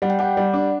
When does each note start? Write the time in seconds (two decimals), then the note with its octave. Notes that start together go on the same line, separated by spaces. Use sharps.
0.02 G3 F#5
0.10 G5
0.19 G4 F#5
0.37 G3
0.53 D4